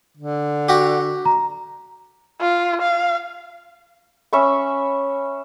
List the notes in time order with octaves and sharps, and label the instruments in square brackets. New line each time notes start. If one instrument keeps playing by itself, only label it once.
[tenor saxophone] D3
[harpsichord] F#4 G4
[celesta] A#5
[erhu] F4
F5
[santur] C#4 E5 B5 C#6